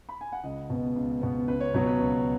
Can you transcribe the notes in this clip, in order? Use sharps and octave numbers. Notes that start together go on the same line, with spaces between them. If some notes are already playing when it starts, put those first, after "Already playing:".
B5
G#5
F#5
C#2 D#5
B2 B3
C#2
B2 B3
C#2 B4
C#5
B2 F#3 B3 B4
B4
C#2